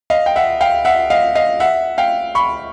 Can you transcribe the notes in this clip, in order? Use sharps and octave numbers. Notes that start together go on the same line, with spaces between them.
D#5 F5
G5
E5 F#5
F5 G5
E5 F#5
D#5 F5
D#5 F5
E5 F#5
F5 G5
B5 C#6